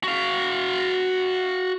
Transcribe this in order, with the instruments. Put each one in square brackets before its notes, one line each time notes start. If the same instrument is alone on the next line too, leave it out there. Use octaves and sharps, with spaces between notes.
[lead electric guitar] F#4 F5